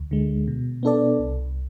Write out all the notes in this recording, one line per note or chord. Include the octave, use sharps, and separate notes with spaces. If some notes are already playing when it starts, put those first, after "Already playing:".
Already playing: D2
D3 G#3
B2
B3 D4 A4 D5
C2